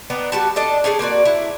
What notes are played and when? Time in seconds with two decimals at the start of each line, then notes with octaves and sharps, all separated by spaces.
0.10 B3 D4 D#4
0.32 G3 F#4 A5
0.56 D4 A4 D#5
0.84 C#4 D#4 G#4 A4
0.99 A#3 C4 F#4 D5
1.25 E4